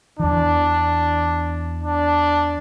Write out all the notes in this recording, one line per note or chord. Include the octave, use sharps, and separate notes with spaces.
E2 E3 D4
D4